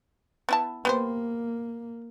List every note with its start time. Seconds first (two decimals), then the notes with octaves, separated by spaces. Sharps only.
0.49 B3 E4 A5
0.85 A#3 B3 G4 C5